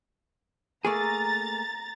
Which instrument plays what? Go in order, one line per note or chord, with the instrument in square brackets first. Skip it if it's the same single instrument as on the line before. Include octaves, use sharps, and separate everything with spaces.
[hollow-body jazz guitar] A3 A#3 G#4 [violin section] A#5 A6